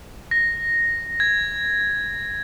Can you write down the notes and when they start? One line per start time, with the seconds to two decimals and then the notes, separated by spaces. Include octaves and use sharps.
0.31 A#6
1.20 G#6